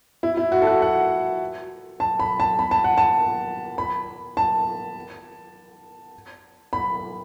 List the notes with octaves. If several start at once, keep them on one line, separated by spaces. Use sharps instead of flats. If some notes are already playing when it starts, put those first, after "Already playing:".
E4
E4
F#4
A4
F#4
F#5
A5
B5
A5
B5
A5
F#5
A5
B5
A5
B5